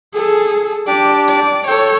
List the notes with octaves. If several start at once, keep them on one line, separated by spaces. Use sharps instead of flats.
G#4 A4
D4 G4 D5
D5
A4 C#5 G5